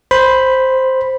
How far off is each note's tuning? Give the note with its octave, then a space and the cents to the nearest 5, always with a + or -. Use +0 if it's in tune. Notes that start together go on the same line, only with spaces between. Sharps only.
C5 +0 B5 +0